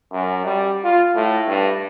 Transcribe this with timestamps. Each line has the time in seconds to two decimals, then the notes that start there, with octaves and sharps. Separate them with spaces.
0.12 F#2
0.45 G3
0.84 F4
1.15 A2
1.48 G2